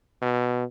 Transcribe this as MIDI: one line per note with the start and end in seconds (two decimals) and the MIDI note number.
0.22 0.65 47